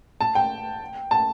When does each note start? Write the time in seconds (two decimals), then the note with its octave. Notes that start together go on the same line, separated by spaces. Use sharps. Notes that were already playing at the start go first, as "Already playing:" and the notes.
0.21 A5
0.35 G5
1.11 A5